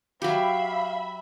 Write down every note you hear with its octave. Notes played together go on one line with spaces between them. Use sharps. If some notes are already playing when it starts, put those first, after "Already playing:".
F#3 G4 E5 F5 B5